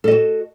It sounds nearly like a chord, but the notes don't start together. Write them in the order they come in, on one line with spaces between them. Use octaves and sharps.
A4 D#5 F#4